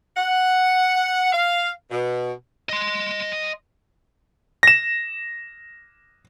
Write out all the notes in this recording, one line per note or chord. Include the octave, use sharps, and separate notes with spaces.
F#5
F5
B2
D#5 C6
A#6 E7